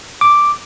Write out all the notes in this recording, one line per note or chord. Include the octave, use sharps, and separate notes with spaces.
D6